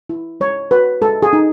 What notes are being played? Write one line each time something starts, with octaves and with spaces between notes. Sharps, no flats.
E4
G#3 C#5
F#4 B4
G#3 A4
G#4
D#4